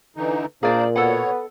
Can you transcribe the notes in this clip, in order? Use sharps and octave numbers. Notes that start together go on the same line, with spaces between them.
D3 E3 D#4
A#2 A#3 D4 G#4 C5 D5
B2 B3 A4 C#5 F#5